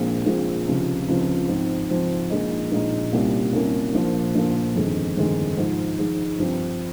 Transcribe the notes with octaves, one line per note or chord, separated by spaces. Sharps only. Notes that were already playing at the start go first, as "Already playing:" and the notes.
Already playing: A#1 A#2 G#3 C4
A#1 A#2 G#3 C4
C#2 C3 F3
C#2 C3 F3
G#2 F3 C4
G#2 F3 C4
A#1 A#2 G#3 D#4
A#1 A#2 G#3 D#4
C2 A#2 G3 A#3 C#4
C2 A#2 G3 A#3 C#4
A#1 A#2 F3 A#3
A#1 A#2 F3 A#3
G1 F2 D#3 G#3
G1 F2 D#3 G#3
G#2 F3 G#3
G#2 F3 G#3
G2 F3 C4